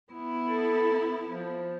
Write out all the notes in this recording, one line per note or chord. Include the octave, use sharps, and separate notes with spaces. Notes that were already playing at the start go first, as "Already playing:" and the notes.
B3 E4
A4
F3